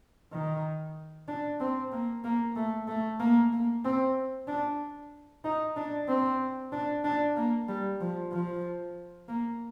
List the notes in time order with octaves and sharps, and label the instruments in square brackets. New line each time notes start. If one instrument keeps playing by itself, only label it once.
[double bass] D#3
D4
C4
A#3
A#3
A3
A3
A#3
A#3
C4
D4
D#4
D4
C4
D4
D4
A#3
G3
F3
F3
A#3